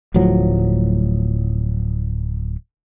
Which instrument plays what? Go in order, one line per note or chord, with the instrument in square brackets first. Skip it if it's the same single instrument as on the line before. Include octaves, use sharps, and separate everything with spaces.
[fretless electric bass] D1 A2 F3 F#3